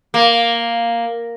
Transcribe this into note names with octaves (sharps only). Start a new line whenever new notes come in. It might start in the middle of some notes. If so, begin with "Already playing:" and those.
A#3